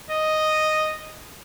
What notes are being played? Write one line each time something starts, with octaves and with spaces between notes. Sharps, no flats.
D#5